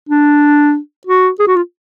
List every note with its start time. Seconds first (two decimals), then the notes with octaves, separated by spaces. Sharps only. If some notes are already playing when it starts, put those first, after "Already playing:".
0.09 D4
1.07 F#4
1.39 G#4
1.47 F#4
1.56 F4